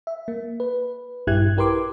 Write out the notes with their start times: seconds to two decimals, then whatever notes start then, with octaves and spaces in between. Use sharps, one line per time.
0.07 E5
0.28 A#3
0.60 B4
1.27 A#1 G2 E4 G4 F#6 G#6
1.57 E4 G4 A#4 B4 C6 D6